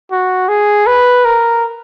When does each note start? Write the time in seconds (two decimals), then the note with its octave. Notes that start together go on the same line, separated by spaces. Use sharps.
0.11 F#4
0.49 G#4
0.86 B4
1.25 A#4